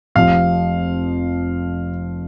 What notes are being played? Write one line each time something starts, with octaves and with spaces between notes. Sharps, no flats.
F1 F2 C3 F3 F5